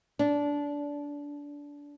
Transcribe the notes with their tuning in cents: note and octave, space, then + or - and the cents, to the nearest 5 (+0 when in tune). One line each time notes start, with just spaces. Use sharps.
D4 -20